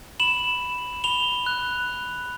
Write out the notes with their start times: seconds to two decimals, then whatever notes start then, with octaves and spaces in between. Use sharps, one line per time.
0.20 B5 E7 F#7
0.62 B5
1.04 B5 F7 G7
1.46 F#6
1.89 B5